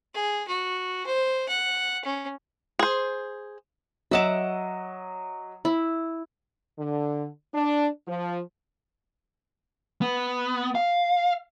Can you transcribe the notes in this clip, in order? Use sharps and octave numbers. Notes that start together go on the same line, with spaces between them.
G#4
F#4
C5
F#5
C#4
G#4 C5
F#3 D#5 E5 F#5 D6 E7
E4
D3
D4
F3
B3
F5